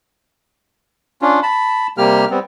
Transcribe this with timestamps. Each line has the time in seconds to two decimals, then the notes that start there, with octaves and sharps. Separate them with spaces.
1.22 C#4 D4 F4
1.43 A5 B5
1.98 C3 G3 A#3 G4 F6
2.30 G3 B3 C4